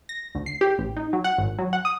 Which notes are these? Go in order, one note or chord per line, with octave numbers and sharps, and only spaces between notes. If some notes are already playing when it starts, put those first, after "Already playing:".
A#6
D2
C7
G4
A1
D#4
F#3
F#5
G#1
F#3
F#5
D#6